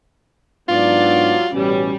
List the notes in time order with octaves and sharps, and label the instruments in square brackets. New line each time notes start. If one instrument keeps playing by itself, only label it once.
[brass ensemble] G#2 B3 D4 [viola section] F#3 D5 [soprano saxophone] F4
[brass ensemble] A1 B2 C#4 [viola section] G3